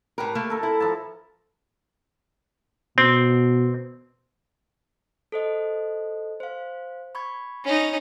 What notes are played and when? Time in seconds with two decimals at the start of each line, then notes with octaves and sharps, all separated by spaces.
0.18 A2 G4 A#4 B4
0.35 A3 A#3
0.50 A4 A#4
0.63 E4
0.80 F3 A4 A5
2.98 B2 C4
5.32 A4 C5 D#5
6.40 C5 F5
7.15 B5 C#6 G#6
7.64 C#4 D#4